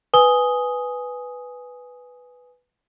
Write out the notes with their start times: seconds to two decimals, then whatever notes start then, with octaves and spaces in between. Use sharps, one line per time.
0.14 B4 G#5 D#6 G7